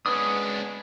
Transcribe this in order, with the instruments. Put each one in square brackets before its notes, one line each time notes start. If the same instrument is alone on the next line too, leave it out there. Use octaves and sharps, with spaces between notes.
[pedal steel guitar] G#3 D#6 [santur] B3 [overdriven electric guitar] C#4 D4